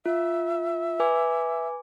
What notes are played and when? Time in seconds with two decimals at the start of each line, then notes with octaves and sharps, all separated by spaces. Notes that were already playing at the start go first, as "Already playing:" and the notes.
0.06 F4 E5
1.00 B4 G#5 D6